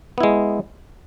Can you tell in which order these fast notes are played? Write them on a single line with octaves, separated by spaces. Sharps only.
B3 E4 G#3